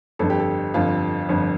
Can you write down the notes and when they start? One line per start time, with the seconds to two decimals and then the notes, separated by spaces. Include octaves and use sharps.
0.19 G1 F2 D3 A4
0.30 G4
0.39 A4
0.74 G1 F2 D3 F4
1.29 G1 F2 D3